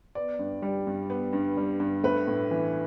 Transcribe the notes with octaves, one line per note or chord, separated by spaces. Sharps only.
B3 D5
G2
G3
G2
B3
G2
G3
G2
A3 B4
A2
E3